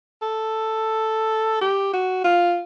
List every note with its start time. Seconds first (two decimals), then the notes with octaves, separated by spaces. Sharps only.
0.22 A4
1.61 G4
1.93 F#4
2.24 F4